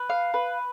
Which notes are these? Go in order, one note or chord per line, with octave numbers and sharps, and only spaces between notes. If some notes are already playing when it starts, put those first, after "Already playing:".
Already playing: B4
F5
B4